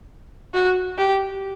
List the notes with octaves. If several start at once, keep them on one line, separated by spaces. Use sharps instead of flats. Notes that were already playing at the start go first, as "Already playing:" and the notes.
F#4
G4